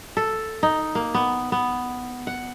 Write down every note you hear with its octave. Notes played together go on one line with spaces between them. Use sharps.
A4
D#4
A#3
B3
B3
F#5